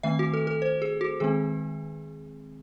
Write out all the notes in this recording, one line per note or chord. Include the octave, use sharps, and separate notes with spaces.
D#3 A3 C4 E5
F#4
A4
A4
C5
G#4
F#4
D#3 G#3 C4 G#4